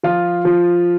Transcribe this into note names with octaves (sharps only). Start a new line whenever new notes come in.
F3 F4
F3